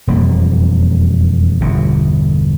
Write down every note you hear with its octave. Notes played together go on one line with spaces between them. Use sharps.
E1 F2 G3 A#3
G1 E2 B2